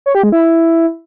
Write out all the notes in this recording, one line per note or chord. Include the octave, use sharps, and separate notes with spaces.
C#5
G4
G#3
E4